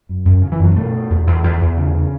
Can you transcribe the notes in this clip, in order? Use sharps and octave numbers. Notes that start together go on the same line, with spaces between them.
F#2
F#2
C#3
E3
F#2 F#3
B2 A3
B2
E2
E2
E2
E2
C#3
C#3